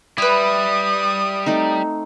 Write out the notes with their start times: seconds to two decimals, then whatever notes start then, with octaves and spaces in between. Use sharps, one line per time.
0.18 G3 E4 B4 D#6
1.46 A3 C4 D#4